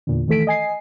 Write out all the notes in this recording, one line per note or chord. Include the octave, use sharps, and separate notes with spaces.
E2 A#2 D3
D#3 E3 A3 A4 B6 D7
D#5 G#5 C7